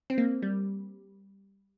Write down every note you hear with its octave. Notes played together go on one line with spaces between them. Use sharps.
C4
A#3
G3